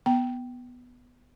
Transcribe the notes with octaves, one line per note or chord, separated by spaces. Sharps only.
B3 G5